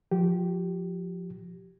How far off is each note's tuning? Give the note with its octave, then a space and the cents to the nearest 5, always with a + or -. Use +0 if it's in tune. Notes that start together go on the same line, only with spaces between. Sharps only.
F3 +15 G4 -15